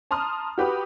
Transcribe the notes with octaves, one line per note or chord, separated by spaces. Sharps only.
A5 A#5 C6 D#6 F6
F#4 G4 B4 B5 D#6